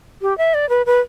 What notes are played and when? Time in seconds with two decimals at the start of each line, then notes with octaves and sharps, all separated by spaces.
0.22 G4
0.38 E5
0.54 D5
0.69 B4
0.86 B4